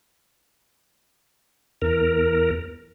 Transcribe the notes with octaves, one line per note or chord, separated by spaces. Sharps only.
E2 A#4